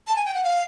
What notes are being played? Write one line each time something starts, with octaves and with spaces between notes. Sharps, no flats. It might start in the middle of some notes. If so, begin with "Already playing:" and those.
A5
G#5
G5
F#5
F5